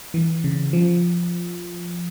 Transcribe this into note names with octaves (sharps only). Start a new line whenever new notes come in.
E3
C#3
F3